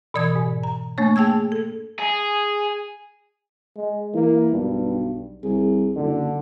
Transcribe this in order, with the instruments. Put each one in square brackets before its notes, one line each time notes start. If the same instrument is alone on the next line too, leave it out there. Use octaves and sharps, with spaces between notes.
[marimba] B2 E3 D5 D#6 G#6
G#2
A#5
A3 A#3 D4 C#5
G#4 G5 A5 E6 G#6
A4
[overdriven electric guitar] G#4
[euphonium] G#3
[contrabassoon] E3 [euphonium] A#3
[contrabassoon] B1 [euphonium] G2
[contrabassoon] C2 [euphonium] G#4
[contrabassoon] F#1 [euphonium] D3